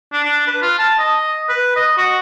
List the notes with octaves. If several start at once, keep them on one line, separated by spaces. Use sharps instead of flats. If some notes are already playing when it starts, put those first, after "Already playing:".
D4
D4
B4
F4
A5
D#5
B4
D#5
F#4